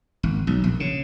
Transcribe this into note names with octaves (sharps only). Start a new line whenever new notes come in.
G#1
B1
A#1
C#3